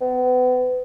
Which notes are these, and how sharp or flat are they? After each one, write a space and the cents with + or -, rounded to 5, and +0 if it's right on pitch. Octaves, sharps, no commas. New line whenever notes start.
B3 +35